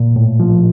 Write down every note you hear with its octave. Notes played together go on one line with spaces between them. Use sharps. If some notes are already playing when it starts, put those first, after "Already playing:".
Already playing: A#2
A2
F3